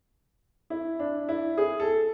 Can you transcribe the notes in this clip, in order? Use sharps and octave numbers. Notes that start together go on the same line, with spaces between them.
E4
D4
E4
G#4
A4